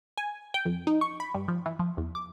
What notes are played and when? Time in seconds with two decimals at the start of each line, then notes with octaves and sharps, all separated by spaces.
0.17 G#5
0.54 G5
0.65 F2
0.87 D#4
1.01 C#6
1.20 B5
1.34 G2
1.48 F3
1.66 E3
1.79 F3
1.97 E2
2.15 D6